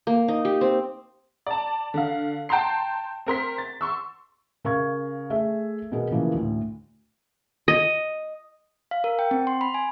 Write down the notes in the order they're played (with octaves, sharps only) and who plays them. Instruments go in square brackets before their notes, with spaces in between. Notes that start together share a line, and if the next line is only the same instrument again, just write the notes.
[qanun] A#3
D#4
G4
C4
[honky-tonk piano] D5 A5
D3 F5
G5 A5 A#5 C6 C7
C4 A#4 C6 B6
A6
C6 C#6 E6
[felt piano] C#3 A#4 F5 C#6 G#6
A3 G#4 E5
B2 B3 G#4 A#4
C#3 E3 F3 A#3
D2 A2
[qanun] D#5
[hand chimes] F5
A#4
G5
C4
C6
B5
G#5